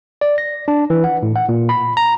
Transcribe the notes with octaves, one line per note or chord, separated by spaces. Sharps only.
D5
A#6
D4
E3
F#5
A2
F#5
A#2
B5
A#5